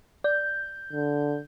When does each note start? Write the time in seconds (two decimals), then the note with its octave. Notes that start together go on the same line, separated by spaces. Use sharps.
0.24 D5 G6
0.93 D3